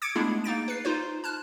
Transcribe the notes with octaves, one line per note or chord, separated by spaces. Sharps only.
D6 G#6 C#7 D7
G#3 A3 B3 D4 E4 G#4
A#3 D#4 A6 D7
B4 C7
D#4 F4 C5
A5 F6 F#6